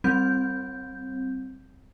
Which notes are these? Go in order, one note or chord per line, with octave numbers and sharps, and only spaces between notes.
G3 C4 G6